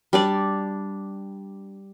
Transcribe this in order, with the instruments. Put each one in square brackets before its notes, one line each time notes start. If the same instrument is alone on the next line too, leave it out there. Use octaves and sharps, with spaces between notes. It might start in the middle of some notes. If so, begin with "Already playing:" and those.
[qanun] G3 D4 D5